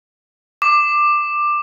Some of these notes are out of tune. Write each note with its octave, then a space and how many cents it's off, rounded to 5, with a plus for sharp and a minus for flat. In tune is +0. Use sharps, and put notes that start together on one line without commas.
D6 +15